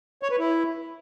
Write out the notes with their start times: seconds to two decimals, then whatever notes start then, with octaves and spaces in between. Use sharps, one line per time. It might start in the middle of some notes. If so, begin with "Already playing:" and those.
0.23 C#5
0.31 B4
0.39 E4